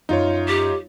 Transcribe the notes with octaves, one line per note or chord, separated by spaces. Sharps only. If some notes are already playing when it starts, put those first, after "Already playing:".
F#2 D#4 F4 C#5
G4